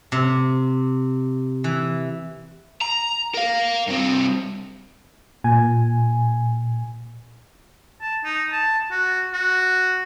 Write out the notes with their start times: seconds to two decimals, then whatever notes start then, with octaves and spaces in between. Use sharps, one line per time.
0.12 C3
1.64 E3
2.81 A#5
3.34 A#4 F5
3.88 G2 C4
5.44 A#2 G#5
8.01 A5
8.25 D#4
8.52 A5
8.91 F#4
9.34 F#4